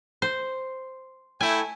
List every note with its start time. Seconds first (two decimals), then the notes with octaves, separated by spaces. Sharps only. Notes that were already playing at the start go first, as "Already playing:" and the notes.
0.22 C5
1.41 A3 E4 G5 G#5